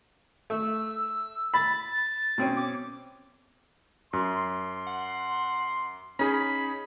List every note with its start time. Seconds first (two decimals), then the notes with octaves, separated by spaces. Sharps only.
0.50 A3 E6
1.54 B5 A6
2.38 B2 C4 C#4
2.56 D6
4.13 F#2 C6
4.87 F#5
6.19 C#4 D#4 G#4 B5